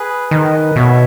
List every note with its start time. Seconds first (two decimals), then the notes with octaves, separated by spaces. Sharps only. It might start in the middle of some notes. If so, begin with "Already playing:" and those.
Already playing: G#4 B4
0.31 D#3 B4 D#5
0.53 B4 D#5
0.76 B2 C#5 E5